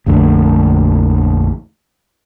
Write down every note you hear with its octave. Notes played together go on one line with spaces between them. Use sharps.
A#1 F2 D3 A3